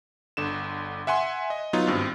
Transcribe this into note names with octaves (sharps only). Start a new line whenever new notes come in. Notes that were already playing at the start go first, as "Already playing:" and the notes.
G1 D3 E7
E5 F#5 G#5 C6
D#5
F#3 B3 D#4 F4
G#1 G2 C4